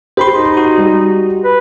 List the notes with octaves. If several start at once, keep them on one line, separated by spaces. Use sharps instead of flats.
G4 C5 B5 C6
D#4
F#4
G3
B4